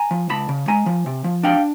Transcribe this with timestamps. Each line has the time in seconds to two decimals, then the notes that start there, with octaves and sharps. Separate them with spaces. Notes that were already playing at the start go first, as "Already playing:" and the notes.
Already playing: G#5 A#5
0.11 F3
0.29 C#2 A5 B5
0.49 C#3
0.68 G#3 G#5 A#5
0.86 F3
1.06 C3
1.24 F3
1.43 D4 F5 G5